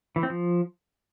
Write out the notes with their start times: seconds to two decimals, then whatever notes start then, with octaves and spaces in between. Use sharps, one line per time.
0.16 E3
0.23 C4
0.30 F3